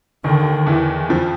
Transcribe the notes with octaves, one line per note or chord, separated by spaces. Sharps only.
D#2 D3 D#3
E2 E3
F2 F3